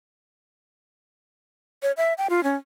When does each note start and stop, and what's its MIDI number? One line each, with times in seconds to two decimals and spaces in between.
1.83 1.92 73
1.97 2.13 76
2.18 2.27 79
2.30 2.43 65
2.44 2.56 61